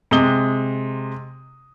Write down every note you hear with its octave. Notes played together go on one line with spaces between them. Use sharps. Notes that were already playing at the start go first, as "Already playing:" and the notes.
C3 G#3 D#6 G7